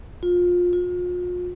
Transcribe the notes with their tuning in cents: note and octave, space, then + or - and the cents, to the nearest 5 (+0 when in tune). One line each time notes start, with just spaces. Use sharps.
F4 +25
F4 +40